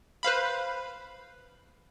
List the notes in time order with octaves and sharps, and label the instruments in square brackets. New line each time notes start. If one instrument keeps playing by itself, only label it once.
[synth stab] B4 C5 F5 B5